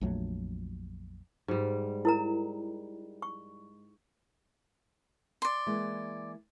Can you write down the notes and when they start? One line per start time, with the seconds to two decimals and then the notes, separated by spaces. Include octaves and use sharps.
0.01 A#1 F2 F#3 A3
1.48 G#2 G3
2.05 E4 A#4 A#5
3.22 C#6
5.42 D5 C6
5.66 E3 G#3 A#3